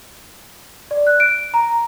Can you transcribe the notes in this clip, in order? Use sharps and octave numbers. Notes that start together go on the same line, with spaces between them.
D5
F#6
D7
A#5